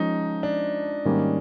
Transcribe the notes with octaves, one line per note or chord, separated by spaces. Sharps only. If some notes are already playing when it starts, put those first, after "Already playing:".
Already playing: F3 G#3 C#4 D#4
D4
G#2 D#3 G3 A#3 C#4